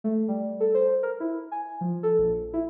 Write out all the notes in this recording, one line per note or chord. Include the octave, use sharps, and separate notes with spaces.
A3
G3
A4
C5
A#4
E4
G#5
F3
A4
A#1
E4